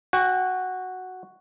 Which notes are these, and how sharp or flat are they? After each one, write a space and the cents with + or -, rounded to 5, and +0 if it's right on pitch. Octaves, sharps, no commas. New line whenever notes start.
F#4 +0 G5 +40